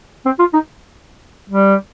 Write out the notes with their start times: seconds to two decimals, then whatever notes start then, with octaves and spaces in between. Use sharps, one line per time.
0.26 C4
0.39 F4
0.53 D#4
1.50 G3